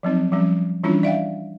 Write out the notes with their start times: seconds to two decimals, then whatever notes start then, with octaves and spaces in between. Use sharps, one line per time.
0.03 F3 F#3 C4 D#4
0.32 F3 G3 C#4
0.83 E3 G3 C#4 D4 E4 F4
1.03 D5 E5 F5 G5